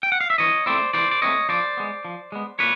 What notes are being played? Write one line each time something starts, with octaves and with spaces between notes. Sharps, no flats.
G5
F#5
F5
E5
E3 C#5 D#5
A3 C4 E4 C5 D5
E3 C5 D5
D5
A3 C4 E4 C#5 D#5
F3 C5 D5
G#3 B3
F3
G#3 B3
A#2 B4 C#5